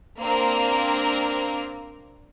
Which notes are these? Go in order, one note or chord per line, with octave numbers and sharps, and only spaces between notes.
A#3 C4 D4 A#4